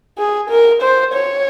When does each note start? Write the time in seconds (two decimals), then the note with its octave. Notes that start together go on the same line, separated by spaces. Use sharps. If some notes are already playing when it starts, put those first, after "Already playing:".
0.18 G#4
0.50 A#4
0.82 C5
1.14 C#5